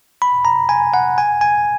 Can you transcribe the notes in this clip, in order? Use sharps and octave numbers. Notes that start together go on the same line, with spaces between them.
B5
A#5
G#5
F#5
G#5
G#5